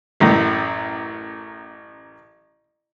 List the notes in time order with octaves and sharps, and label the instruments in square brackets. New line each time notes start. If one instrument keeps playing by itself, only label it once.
[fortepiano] A1 F#2 A2